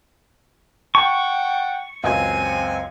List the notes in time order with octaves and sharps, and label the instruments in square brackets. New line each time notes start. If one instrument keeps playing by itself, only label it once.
[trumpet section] F#5 G5 [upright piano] A5 [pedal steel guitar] C#6
[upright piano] C#2 F#2 D#5 [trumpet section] C4 [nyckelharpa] G#5